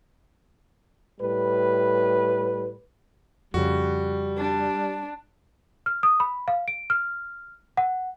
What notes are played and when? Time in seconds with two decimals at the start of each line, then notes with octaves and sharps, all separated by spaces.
1.20 A2 G3 B4
3.54 F2 C#3 G3 F#4
4.38 D4
5.86 F6
6.03 D#6
6.20 B5
6.48 F5
6.68 D7
6.90 F6
7.77 F#5